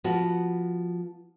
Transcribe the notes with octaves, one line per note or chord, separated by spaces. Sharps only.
F3 B3 F#4 F#5